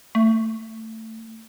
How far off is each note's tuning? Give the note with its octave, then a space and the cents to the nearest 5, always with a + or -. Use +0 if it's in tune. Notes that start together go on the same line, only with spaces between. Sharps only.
A3 +20